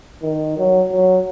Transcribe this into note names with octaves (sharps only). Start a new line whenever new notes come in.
D#3
F#3
F#3